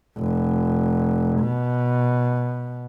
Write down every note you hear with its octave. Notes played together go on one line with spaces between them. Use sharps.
F1
B2